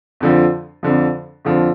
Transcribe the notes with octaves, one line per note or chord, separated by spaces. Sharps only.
F2 D3 F3
F2 D3 F3
F2 D3 F3